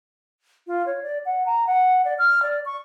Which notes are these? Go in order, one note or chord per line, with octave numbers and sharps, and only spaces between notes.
F4
C#5
D5
F#5
A#5
F#5
D5
F6
D5
C#6